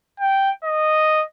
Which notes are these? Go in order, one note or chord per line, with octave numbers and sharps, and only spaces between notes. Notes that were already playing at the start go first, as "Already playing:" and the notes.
G5
D#5